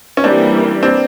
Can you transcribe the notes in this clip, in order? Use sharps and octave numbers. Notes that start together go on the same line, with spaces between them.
C#4
E3 G3 A#3 C4 D4
C4 D4